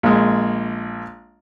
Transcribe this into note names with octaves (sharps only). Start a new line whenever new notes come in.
A#1 G#3